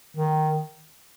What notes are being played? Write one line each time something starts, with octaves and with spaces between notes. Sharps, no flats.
D#3